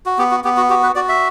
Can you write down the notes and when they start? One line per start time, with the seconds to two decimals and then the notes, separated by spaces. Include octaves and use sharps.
0.06 F#4
0.18 B3 G4
0.31 F#4
0.44 B3 G4
0.57 F#4
0.70 F#4 G4
0.83 B4
0.95 F#4 D5
1.09 E5